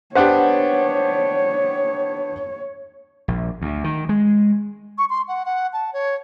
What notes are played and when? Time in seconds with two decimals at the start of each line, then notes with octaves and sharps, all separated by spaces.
0.15 B3 D4 G4 C5 C#5 F#5
3.28 A#1
3.62 D2
3.84 D#3
4.09 G#3
4.98 C#6
5.10 C6
5.28 F#5
5.46 F#5
5.73 A5
5.93 C#5